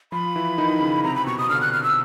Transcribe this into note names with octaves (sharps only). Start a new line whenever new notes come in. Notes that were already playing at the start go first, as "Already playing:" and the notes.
F3 F4 B5
E3 E4
D#3 D#4
C#3 C#4
C3 C4 A#5
B5
B2 B3 C#6
D#6
D3 D4 F6
F#6
F6
E6